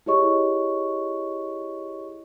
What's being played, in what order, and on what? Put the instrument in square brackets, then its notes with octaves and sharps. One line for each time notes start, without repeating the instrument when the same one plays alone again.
[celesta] E4 G4 G#4 C#5 D#5 C#6